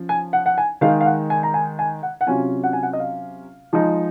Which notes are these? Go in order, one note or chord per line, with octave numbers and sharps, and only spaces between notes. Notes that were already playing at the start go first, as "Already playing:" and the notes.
Already playing: F3 C#4
G#5
F#5
F#5
G#5
D#3 G#3 D#4 F5
F5
F#5
G#5
A#5
G#5
G#5
F#5
F#5
C3 F#3 C#4 F4 G#5
F#5
G#5
F#5
D#5
F5
F3 G#3 D#4